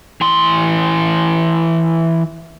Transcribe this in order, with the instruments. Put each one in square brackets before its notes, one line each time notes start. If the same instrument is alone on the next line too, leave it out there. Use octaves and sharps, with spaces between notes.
[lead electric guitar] E3 C6